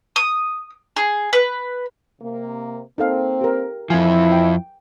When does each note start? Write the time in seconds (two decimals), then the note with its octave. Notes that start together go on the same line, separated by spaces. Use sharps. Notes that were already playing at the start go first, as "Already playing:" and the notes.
0.16 D#6
0.96 G#4
1.33 B4
2.21 C3 A#3
2.98 A#3 C4 D#4 A4 F5
3.41 G4 A#4
3.90 F2 E3 F3 E4 G#5
4.32 G5